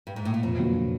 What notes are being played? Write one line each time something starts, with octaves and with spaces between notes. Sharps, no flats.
G2
G#2
A2
A#2
F2 B2
D3 F#3 A#3